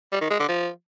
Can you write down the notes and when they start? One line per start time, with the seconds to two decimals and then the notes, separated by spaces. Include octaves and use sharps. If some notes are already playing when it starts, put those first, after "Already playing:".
0.12 G3
0.21 D#3
0.31 G#3
0.40 D3
0.49 F3